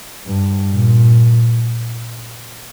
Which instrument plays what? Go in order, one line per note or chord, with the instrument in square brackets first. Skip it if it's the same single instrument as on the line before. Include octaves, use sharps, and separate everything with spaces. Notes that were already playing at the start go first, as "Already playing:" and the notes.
[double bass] G2
A#2